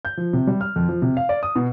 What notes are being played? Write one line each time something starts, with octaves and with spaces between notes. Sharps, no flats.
G6
F3
C3
G3
F6
F2
F3
C3
F5
D5
D#6
B2